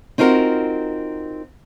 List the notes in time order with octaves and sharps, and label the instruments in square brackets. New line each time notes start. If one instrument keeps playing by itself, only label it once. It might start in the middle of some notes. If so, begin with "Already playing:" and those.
[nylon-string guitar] C4 D#4 F4 F#4 A#4